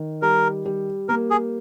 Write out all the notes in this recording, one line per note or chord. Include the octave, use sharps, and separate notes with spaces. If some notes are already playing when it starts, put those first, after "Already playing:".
Already playing: D#3
G3 A#4
G3
A#3 A#4
G#4